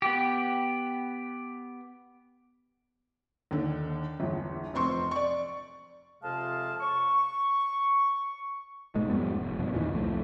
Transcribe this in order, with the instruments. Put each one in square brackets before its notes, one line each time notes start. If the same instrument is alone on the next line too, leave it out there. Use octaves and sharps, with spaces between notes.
[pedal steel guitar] B3 G4
[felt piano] D#2 D3
G1 E2
F1 C4 C6 C#6
D5 C#6
[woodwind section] F2 C3 G#3 F5 A5
C#6
[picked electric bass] G#2 B2 G#3 A3
F2 G#2 G3 B3
F1
G2 B2 F3
E2 A#2 D#3 E3
C2 F2 A3